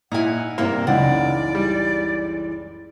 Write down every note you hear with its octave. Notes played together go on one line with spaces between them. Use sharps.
A#2 D#4 E4 F#5 G#5
G2 C3 A#3 A#4 E5
F#1 C#2 E3 G#3 D#4 D5 F#5
G3